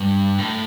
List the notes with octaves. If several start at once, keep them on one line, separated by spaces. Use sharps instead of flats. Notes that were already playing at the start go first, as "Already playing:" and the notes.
Already playing: G2
A2